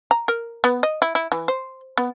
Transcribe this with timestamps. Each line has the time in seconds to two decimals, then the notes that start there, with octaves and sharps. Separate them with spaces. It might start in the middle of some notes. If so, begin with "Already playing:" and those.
0.11 A#5
0.28 A#4
0.64 B3
0.83 D#5
1.02 E4
1.15 E4
1.32 E3
1.48 C5
1.98 B3